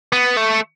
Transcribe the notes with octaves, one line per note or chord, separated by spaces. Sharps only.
B3
A3